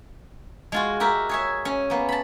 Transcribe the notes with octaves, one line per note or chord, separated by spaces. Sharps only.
G#3 F4 F#4
F#4 G4 A#4 E5
G#4 C#5 E5
C#4
A#3 B3
A5 B5